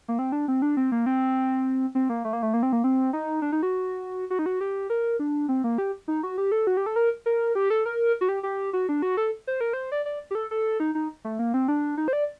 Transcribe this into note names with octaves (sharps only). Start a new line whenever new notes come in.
A#3
C4
D4
C4
D4
C4
A#3
C4
C4
A#3
A3
A#3
A3
A#3
C4
A#3
C4
D#4
D4
D#4
F#4
F#4
D#4
F#4
G4
A#4
D4
C4
A#3
G4
D#4
F#4
G4
A4
F#4
G4
A4
A#4
A#4
G4
A4
A#4
F#4
G4
G4
F#4
D4
F#4
A4
C5
A#4
C5
D5
D5
G4
A4
A4
D#4
D#4
A3
A#3
C4
D4
D#4
C5
D5